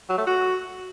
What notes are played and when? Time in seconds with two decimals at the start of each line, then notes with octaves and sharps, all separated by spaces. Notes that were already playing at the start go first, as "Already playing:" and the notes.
0.09 F#3
0.18 A3
0.27 F#4